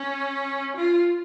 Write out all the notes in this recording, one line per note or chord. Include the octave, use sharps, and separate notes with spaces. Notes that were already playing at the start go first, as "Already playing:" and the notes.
Already playing: C#4
F4